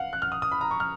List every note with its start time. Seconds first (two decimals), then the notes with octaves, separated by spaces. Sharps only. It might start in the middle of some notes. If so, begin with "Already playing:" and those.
Already playing: F5 F#5
0.13 F#6
0.22 F6
0.32 D#6
0.42 D#6
0.52 B5
0.61 A#5
0.71 C#6
0.80 F6